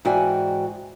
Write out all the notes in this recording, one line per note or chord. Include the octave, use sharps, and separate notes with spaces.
G#2 E3 F#4 D5 G5 G#5